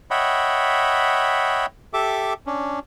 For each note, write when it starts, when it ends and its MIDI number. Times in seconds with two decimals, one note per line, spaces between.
0.11 1.66 73
0.11 1.66 75
0.11 1.66 76
0.11 1.66 78
0.11 1.66 79
0.11 1.66 83
1.93 2.34 67
1.93 2.34 69
1.93 2.34 76
1.93 2.34 86
2.47 2.79 61
2.47 2.79 62